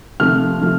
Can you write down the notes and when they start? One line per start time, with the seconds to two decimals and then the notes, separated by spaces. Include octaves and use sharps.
0.20 C3 F3 A3 C4 F6
0.61 C3 F3 A3